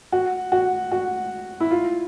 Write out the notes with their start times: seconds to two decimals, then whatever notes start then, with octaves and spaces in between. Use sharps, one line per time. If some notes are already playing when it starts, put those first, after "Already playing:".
0.12 F#4
0.52 F#4
0.92 F#4
1.60 E4
1.71 F4